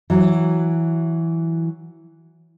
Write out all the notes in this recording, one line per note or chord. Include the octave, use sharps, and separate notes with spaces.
E3 F#3